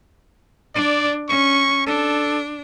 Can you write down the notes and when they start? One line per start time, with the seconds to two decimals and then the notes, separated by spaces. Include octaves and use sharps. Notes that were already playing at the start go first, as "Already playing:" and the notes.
0.75 D4 D5
1.29 C#4 C#6
1.87 D4 A4